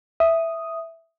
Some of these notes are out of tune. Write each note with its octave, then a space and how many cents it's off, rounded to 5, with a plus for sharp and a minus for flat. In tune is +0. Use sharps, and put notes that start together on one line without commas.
E5 +0 D#6 +0